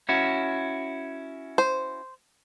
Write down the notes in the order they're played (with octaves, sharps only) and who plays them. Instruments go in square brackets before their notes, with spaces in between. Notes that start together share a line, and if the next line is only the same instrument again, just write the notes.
[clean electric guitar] C#4 E4 F#4
[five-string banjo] C5